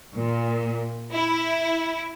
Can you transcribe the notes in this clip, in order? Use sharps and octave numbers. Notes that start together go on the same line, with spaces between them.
A#2
E4